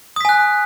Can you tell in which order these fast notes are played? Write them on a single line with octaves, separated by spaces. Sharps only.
D#6 B6 G#5 F#6